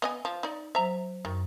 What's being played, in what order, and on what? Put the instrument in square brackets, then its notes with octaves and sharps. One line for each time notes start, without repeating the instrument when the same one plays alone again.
[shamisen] B3 D#5 G#5
F3
D#4 D5
[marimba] F#3 C5 [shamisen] E5 A#5
[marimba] F#2 [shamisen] D#3